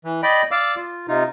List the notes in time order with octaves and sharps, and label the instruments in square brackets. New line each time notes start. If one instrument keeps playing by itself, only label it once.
[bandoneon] E3
D5 D#5 G5 B5
D5 F5 D6 E6
F4
C3 D#4 F4